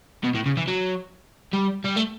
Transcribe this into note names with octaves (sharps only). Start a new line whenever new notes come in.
B2
A2
C#3
E3
F#3
G3
G3
A3